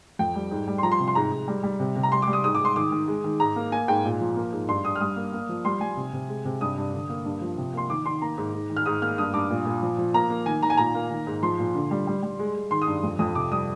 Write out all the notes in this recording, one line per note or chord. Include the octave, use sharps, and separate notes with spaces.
F2 G5
G3
G#2
G3
C6
F3 A#5
C6
C3
C6
G#2 A#5
G#2
G3
G3
C3
C3
A#5
G3 C6
D6
G3
D#6
G#2 D#6
D6
G#2
C6
D#3 D6
D#3
G#3
D#3
G#2 A#5
A#3
A#3 G#5
G#2 G5
A#2
F3
A#3
G#2
G2 C6
G2 D#6
F6
G3 D#6
A#3
A#3
F3
G3 C6
G3 G#5
C3
C3
G#3
C3
G2 D#6
G2
D3
A#3
G2
F3
C3
A#3 C6
D#3 D6
D#3 C6
A#3 A#5
G#2
G#2
D#3
F6
G#2 D#6
A#3 F6
G2 D#6
G2 D6
A#2
A#2
F3
F3
A#3 A#5
A#3
D#3 G#5
D#3 A#5
G#5
A#2 A#5
A#3
D#3
G#2
F3 C6
A#2
D3
G3
G3
G3
G#3
G#3
D#3 C6
D#6
G2
F2
F2 D#6
C3 D6
G3 D#6